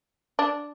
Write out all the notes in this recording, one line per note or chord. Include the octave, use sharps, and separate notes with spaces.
D4